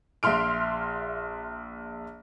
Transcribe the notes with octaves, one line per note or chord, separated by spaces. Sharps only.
A#1 E5 C6 F6 D7